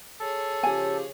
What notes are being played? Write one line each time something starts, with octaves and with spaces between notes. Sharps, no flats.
G#4 A4 C#5
C#3 F3 G4 G#5